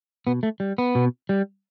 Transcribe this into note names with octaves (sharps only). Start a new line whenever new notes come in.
B2 B3
A3
G3
B3
B2
G3